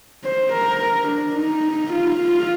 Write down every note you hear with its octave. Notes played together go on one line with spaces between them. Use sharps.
C5
A#4
A#4
D4
D#4
F4
F4